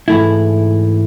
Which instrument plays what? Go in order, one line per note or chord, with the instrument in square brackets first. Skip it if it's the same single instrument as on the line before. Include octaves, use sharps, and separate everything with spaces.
[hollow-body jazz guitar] G#2 E3 A3 E4